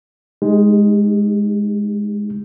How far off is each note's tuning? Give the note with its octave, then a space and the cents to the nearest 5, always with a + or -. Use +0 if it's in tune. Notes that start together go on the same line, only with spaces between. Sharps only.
G#3 +0 D#4 +0 G4 +35